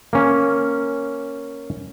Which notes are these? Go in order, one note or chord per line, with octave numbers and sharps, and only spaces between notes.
A#3 C#4